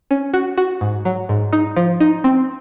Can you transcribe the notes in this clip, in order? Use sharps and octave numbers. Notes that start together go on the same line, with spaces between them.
C#4
F#4
F#4
G#2
F#3
G#2
D#4
F3
D#4
C4